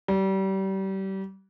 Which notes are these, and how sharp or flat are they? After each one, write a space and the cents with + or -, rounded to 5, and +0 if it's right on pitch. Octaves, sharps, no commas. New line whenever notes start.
G3 -30